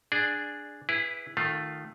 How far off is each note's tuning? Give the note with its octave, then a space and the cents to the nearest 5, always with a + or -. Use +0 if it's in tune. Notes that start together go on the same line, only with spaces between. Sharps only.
D4 +0 G#4 +0 D5 +15
E4 +5 G#4 -30 B4 +0
D#3 -15 A3 +0 F4 +0